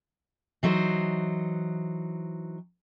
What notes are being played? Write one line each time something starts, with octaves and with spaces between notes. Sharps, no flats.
E3 F#3 D#4 C5